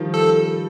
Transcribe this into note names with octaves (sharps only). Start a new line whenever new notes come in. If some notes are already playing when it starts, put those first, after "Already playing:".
Already playing: D#3 F3 G3
A4